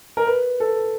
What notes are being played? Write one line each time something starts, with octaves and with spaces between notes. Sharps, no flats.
A#4
B4
A4